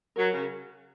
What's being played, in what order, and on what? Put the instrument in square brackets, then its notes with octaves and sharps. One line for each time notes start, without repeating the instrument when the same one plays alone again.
[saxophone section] F#3 [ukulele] A#4
[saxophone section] C#3